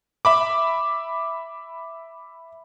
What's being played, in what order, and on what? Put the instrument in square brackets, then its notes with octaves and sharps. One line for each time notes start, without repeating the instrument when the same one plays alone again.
[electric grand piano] E5 B5 D6